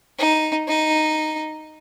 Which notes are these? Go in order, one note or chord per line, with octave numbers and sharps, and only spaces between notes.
D#4
D#4